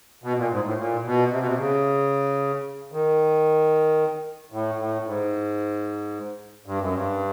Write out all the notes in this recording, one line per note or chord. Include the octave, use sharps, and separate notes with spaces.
B2
A#2
G#2
A2
A#2
B2
C3
B2
C3
C#3
D#3
A2
A2
G#2
G2
F#2
G2